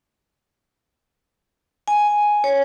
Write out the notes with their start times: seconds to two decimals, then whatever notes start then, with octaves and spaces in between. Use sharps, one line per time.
1.88 G#5
2.44 C#5